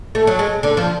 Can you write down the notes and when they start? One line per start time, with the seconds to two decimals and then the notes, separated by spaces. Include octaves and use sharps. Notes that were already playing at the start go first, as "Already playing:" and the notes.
0.15 A3
0.27 F#3
0.39 G#3
0.63 D3
0.77 F3